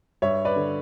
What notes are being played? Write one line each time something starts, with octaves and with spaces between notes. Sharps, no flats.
G2 C#5 E5
B4 D5
D3